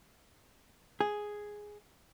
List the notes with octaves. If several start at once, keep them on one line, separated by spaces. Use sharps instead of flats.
G#4